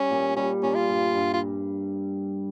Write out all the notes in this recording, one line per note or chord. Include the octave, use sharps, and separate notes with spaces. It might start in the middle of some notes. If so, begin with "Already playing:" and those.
Already playing: G3 C#4
A#2
G3 C#4
A#2 C#4
F4
G2
G2
F4